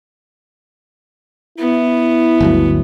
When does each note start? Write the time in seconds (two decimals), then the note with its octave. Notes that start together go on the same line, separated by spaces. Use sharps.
1.58 B3 E4
2.40 G1 D2 F#3